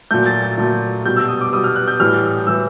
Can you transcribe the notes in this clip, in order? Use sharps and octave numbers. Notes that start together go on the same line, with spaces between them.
A#2 F#3 A3 G6
A6
A6
A#2 F#3 A3
B2 G3 G6
E6
D#6
D6
B2 G3 D#6
F6
F#6
G6
A2 E3 G3 F6
A2 E3 G3 E6